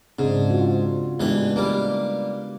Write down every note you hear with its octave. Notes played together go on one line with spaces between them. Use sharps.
G#2 C#3 C4 D4
F4 F#4
A1 E3 G#3 B3 D4 B4
G3 A#3 B4